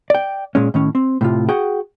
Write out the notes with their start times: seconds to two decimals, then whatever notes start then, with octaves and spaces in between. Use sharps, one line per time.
0.10 D5 G5
0.55 A#2 G#3 C#4
0.74 A2 D#3 C#4
0.95 C4
1.21 A2 C3 F4
1.49 F#4 G#4 F#5 G5